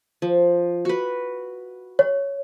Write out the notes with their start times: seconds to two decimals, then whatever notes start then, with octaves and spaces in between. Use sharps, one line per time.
0.22 F3
0.85 F#4 B4
1.99 C#5